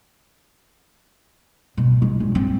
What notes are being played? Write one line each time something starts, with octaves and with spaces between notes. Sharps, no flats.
B2
G#3
G1
C4